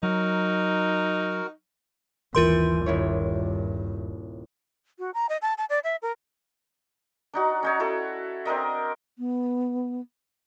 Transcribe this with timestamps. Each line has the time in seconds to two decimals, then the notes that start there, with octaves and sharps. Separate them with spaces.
0.03 F#3 D#4 F#4 A#4
2.35 G1 D#2 E3 F4 A#4 C6 G6
2.86 D#1 G2 E4 C#5
4.99 F#4
5.14 A#5
5.29 D#5
5.42 A5
5.58 A5
5.70 D5
5.84 E5
6.02 A#4
7.34 D4 D#4 F#4
7.63 C#4 D#4 C#5
7.80 E4 F#4 A4
8.45 C4 D4 A#4 D#5
9.19 B3